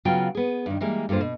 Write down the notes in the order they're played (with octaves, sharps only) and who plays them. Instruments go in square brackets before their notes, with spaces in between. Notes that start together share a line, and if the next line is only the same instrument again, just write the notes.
[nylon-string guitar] C#3 F#3 B3 F4 G5
B3 G#4
G2 D#3
E3 G3 G#3 A#3
G2 D3 A#3 F4 C5
B2